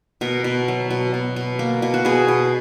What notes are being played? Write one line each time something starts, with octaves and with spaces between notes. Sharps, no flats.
B2 A#4
B2
F#3
B2
B2
B2
A#3
B2
F#4
B2 G#4
B2